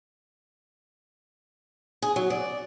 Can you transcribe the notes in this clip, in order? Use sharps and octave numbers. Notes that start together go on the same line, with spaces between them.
G#4
F#3
D5